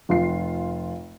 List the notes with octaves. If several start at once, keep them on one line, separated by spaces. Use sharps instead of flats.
F1 F4 C7